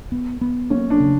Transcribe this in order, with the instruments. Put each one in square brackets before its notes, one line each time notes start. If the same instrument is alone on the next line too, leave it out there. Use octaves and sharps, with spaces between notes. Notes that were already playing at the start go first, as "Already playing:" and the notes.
[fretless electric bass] B3
B3
[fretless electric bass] A#3 [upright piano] C#4
[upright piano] D4
[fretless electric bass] C#3